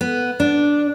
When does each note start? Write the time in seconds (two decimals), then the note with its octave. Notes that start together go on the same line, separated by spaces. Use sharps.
0.01 B3
0.40 D4